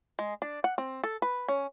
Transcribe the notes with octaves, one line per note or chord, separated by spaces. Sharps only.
G#3
D4
F#5
C4
A4
B4
C#4